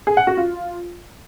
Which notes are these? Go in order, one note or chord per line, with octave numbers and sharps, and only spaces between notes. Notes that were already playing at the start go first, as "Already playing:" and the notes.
G#4
F#5
F#4
F4